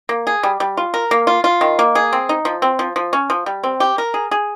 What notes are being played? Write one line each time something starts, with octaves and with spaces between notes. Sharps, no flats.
A#3
G#4
G3
G3
F4
A#4
A#3
F4
F4
D#3
A#3
G#4
C4
D#4
F3
C4
F3
F3
C#4
F3
G3
C4
G4
A#4
G#4
G#4